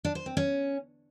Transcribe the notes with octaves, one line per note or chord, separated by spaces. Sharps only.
D4
C5
C4
C#4